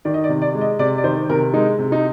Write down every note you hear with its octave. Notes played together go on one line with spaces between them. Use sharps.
D#3 D5
D#5
D5
C3
D5
G#3
D#5
C3 D5
D5
D#3 C5
C3 A#4
G#3 D#4
C3
D#4